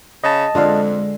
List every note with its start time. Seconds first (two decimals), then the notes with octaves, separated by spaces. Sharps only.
0.24 C#3 D#5 A5
0.55 F2 D3 G#3 F4 F5